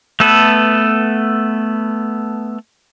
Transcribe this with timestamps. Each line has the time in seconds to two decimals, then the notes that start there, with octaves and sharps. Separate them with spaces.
0.20 A3 B3 A4 B4